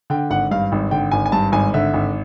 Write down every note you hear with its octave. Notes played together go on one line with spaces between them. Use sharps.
D3 G5
G#1 F#5
G2 F5
G#1
D3 G5
G#1 G#5
G#5
G2 A5
G#1 G#5
D3 E5
G#1